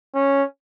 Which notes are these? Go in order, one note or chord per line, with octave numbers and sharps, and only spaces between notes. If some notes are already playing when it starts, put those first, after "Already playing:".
C#4